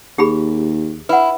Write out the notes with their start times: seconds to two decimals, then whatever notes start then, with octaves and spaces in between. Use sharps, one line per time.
0.18 D#2 G4 G#4 B5
1.09 E4 B4 F#5